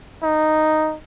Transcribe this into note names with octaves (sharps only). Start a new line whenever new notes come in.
D#4